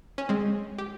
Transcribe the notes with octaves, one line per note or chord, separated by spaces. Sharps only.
C#4
G#3 C4
G4